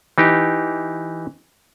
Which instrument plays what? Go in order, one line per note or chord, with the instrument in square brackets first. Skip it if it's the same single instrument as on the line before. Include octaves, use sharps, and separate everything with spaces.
[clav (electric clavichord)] E3 D#4 G4